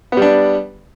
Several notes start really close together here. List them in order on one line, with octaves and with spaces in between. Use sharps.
B3 G3 D4